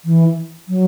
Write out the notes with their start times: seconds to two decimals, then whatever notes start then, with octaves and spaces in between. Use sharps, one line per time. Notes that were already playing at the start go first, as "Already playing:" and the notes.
0.05 E3
0.68 F#3